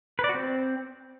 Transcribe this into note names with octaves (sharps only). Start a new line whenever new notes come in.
B4
D5
F#4
C4